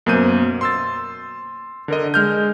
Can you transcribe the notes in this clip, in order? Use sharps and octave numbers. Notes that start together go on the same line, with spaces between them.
F#2 B2 A#3 C5 G6 D#7
C6 E6 A6
D3 A#4 D#5
G#3 F6 G6